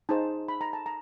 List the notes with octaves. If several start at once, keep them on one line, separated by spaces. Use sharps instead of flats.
D#4 G#4 C5 A5
B5
A#5
A5
A#5